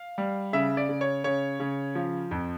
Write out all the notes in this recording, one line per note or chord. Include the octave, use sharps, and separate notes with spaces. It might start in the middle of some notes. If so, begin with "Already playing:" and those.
Already playing: F5
G3
C#3 E5
D5
C#3
C#5
C#3 C#5
C#3
F3
F2